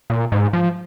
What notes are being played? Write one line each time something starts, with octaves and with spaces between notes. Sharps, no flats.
A#2
G#2
F3